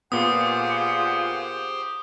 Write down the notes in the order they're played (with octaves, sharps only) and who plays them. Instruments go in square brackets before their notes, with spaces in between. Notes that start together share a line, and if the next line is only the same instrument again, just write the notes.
[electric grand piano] A#2 B3 [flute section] F4 G#4 F#5 [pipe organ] G4 C5 [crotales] D#6